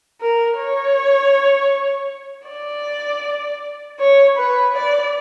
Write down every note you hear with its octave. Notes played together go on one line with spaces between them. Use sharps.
A#4
C#5
D5
C#5
B4
D5